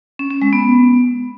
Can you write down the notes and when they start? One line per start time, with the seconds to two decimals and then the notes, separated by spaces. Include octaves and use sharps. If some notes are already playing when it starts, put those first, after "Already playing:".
0.19 C#4
0.30 C#4
0.42 G#3
0.53 B3